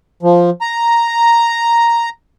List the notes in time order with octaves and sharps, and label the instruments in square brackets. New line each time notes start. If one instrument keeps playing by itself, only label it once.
[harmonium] F3
A#5